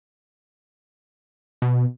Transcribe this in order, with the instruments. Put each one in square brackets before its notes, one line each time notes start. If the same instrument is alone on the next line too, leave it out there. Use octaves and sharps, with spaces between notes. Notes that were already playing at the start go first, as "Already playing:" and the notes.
[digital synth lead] B2